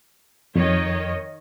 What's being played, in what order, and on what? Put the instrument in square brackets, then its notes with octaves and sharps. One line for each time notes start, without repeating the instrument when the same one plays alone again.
[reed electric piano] F2 [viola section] D#3 C#5 D#5